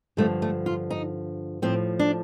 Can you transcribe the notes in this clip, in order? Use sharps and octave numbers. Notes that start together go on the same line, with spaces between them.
G2 D3 F3 A3
A3
F4
D#4
A2 F3 C4
D4